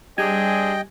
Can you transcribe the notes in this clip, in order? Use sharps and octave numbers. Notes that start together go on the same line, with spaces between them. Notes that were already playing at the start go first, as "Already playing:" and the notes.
G3 C4 D4 G#4 D#5 G5 G#5 G#6